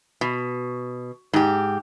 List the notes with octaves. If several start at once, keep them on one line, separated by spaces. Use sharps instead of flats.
B2
G#2 G4